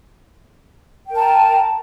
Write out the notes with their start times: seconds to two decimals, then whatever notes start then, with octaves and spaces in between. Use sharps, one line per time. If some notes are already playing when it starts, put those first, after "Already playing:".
1.07 G5
1.11 A#4
1.15 A5
1.19 A#5